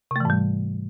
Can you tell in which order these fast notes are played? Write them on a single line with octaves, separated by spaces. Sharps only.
C3 A3 E3 G#2 G3